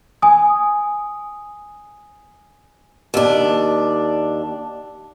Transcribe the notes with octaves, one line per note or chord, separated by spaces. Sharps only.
G#5 D#6
D#2 D4